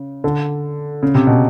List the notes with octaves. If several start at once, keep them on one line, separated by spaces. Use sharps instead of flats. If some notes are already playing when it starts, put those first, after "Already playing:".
Already playing: C#3
D3
C#3
C3
B2